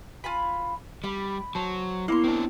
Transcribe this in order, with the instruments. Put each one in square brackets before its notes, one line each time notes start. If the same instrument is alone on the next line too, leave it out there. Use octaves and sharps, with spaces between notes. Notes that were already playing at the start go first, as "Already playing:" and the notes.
[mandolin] F4 G#5 B5
[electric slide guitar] G3 [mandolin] B5
[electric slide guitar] F#3 [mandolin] C5 [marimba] A5
[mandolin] A#3 C#5 C6 [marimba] B3 E4
[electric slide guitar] C4 D4